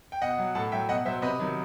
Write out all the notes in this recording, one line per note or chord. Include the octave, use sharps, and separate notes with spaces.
G5
B2 D#5 F#5
F#3
A2 F#5 A5
F#3 E5 G5
B2 D#5 F#5
F#3 C5 E5
C3 B4 D#5
D#3 F#3